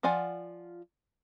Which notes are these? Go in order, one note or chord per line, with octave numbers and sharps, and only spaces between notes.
F3 F4 D5 F#5 G#5